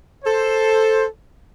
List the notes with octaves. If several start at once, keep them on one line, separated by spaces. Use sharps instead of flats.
A4 C5